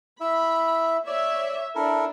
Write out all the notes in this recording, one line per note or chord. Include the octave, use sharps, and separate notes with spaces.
E4 E5 B5
C#5 D5 E5
D4 E4 A4 A#4